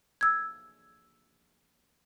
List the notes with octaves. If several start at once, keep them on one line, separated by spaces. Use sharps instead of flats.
E6 G#6